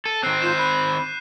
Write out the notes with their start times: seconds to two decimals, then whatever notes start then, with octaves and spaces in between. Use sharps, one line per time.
0.06 A4 D#7
0.23 D#3 C4 F#6 C7
0.42 F4 G6 C7 E7
0.58 B5 F#6 C7